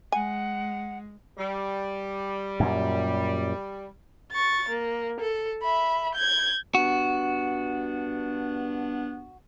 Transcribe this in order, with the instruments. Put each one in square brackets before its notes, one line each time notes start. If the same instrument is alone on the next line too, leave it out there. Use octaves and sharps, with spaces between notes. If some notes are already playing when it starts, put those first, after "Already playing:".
[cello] G#3 [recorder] F#5 [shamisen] G#5
[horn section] G3
[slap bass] F#2 A#2
[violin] C#6 A6
A#3
A4
E5 B5
G6 G#6
[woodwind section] G2 B3 D4 [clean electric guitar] F#4